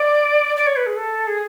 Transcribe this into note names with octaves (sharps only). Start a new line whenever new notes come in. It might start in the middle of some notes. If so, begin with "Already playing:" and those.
Already playing: D5
D5
C#5
B4
G#4
A4
G#4